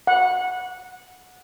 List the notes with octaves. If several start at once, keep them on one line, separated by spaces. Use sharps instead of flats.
F#5